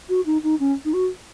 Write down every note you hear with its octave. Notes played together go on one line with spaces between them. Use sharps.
F#4
D#4
D#4
C#4
D#4
F#4